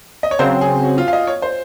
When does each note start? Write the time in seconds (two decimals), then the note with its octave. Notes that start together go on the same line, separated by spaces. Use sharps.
0.23 D#5
0.31 C#5
0.39 C#3 F#3 C4 C5
0.61 G#4
0.83 F#4
0.98 F4
1.08 F5
1.13 D#5
1.27 C#5
1.42 C5